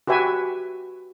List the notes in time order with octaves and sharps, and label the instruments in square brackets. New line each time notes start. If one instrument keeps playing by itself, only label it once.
[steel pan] F#4 G4 B4 E5 G#5